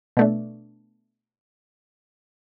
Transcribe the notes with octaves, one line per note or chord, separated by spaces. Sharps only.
B2 A3 D4